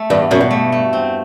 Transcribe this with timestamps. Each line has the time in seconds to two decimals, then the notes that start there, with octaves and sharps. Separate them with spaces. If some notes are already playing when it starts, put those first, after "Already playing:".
Already playing: A3
0.10 E2 G2
0.31 F#2 B2
0.41 G2
0.51 A3
0.72 A3
0.93 C4